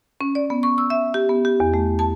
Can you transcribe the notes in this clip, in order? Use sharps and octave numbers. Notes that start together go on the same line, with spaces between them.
C#4
D5
B3
C#6
E6
E5
G4
B3
G4
E2
A3
A5